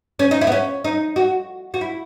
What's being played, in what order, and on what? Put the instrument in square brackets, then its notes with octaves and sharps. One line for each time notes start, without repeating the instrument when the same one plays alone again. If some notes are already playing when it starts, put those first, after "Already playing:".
[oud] C#4
D#4
E4
B3
C#4
D#4
F#4
F#4
E4